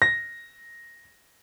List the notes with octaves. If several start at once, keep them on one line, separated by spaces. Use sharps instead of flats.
A#6